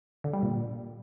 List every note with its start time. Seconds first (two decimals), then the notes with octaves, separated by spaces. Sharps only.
0.24 D3
0.33 G3
0.43 A#2